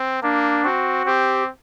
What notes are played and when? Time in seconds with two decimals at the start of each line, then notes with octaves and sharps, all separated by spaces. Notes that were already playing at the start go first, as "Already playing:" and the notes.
Already playing: C4
0.23 A#3 D4
0.64 C4 F#4
1.06 C4 G4